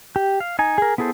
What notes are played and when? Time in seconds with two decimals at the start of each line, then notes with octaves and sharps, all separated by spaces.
0.16 G4
0.40 F5
0.59 D#4 G#5
0.78 G#4 A#4
0.98 B3 E4 G#4 A4 C5